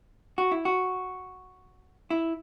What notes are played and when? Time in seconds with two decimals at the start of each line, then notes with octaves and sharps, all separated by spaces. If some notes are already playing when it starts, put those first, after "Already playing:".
0.38 F#4
0.52 E4
0.65 F#4
2.10 E4